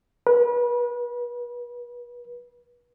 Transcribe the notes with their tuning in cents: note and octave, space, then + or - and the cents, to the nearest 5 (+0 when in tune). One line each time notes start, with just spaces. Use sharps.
B4 -35